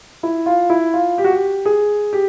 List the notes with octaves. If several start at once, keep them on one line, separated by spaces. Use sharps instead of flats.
E4
F4
E4
F4
G4
F#4
G4
G#4
G4